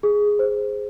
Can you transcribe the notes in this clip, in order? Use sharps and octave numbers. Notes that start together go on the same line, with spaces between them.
G#4
C5